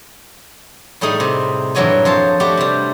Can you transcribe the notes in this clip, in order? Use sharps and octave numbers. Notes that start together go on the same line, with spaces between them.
A2 G3 A3 D#4 G#4
C3
G2 A#2 E3 F#3 C#5 G#5
F2 C5 C#5 A5
A3 D4 F#4 G4 F#5 B5
C3 G3